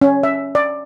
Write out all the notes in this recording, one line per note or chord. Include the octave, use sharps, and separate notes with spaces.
C#4
E5
D5